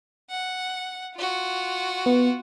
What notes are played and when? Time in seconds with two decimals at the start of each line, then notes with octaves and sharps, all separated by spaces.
0.30 F#5
1.16 F4 F#4
2.06 B3